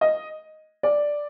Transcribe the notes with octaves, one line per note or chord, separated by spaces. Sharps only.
D#5
D5